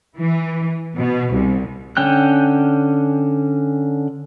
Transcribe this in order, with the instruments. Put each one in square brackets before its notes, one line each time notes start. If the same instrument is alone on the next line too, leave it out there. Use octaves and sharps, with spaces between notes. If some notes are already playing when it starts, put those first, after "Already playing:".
[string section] E3
B2
C2
[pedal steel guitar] D3 C#4 G5 F#6